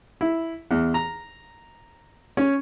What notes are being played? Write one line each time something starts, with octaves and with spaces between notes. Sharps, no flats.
E4
E2
A#5
C#4